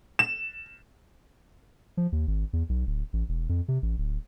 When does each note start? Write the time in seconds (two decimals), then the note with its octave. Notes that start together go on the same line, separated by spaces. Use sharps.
0.19 E7
1.97 F3
2.12 D#2
2.27 G#1
2.53 E2
2.69 B1
2.87 D1
3.13 A1
3.29 E1
3.49 F2
3.68 C3
3.82 A1
3.98 D1